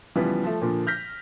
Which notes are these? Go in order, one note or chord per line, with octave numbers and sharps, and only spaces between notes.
C#3 E3 F3 G3 B3
F3 A3
A#2 D3 F3
F6 G6 A#6 B6